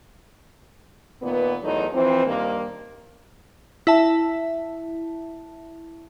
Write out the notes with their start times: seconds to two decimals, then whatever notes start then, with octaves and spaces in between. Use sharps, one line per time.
1.22 A#2 D#3 B3
1.62 E2 F#3 A3 A#3 D#4
1.93 E3 F3 C4
2.26 G2 D#3 A#3
3.87 E4 E5 A5